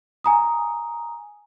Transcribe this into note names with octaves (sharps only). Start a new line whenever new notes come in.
G#5 A#5 D#6